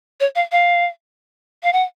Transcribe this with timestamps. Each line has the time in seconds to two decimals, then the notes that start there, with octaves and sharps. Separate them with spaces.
0.20 C#5
0.36 F5
0.52 F5
1.63 F5
1.73 F#5